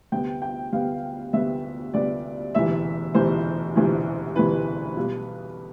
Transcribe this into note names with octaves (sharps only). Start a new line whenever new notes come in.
D2 C3 G3 B3 G5
G5
D2 C3 G3 B3 F5
D2 C3 G3 B3 E5
D2 C3 G3 B3 D5
E1 D2 C3 E3 E5
E1 D2 C3 E3 C5
E1 D2 C3 E3
E1 D2 C3 E3 B4
B1 B2 G3